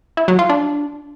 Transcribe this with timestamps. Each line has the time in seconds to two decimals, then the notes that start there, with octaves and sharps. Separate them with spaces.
0.17 E4
0.28 F#3
0.39 F4
0.49 D4